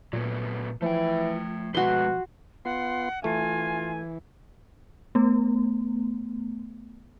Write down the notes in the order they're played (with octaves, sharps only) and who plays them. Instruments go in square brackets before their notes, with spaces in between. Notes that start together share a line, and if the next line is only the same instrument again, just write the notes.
[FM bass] A#2 [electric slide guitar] F#3 A3 B3
[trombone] E3 [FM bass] F3 [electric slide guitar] A3 G5
[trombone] B2 [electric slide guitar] G#3 A3 B4 [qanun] F#4 C6
[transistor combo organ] B3 F4 C6 [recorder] F#5
[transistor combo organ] E3 [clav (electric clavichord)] A3 [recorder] F4 [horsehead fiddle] G#5
[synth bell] A3 B3